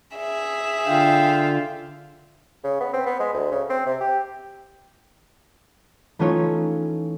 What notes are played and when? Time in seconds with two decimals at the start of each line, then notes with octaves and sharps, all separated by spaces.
0.16 G#4 E5
0.87 D3 F4 F5 G5
2.64 C#3
2.81 B3
2.93 C4
3.06 B3
3.20 G#3
3.34 D2
3.52 C#3
3.70 C4
3.86 C3
4.01 G4
6.19 E3 A3 C#4 D#4 F4 C#5